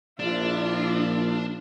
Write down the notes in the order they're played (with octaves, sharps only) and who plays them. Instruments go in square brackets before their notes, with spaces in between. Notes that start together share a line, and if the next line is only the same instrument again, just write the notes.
[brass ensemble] A#1 [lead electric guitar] D4 [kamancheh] E4 F4